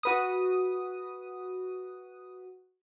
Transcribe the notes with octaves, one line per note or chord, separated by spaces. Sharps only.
F#4 B4 D#6